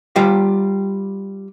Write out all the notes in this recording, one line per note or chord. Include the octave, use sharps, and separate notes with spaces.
G3 F4 G4 F5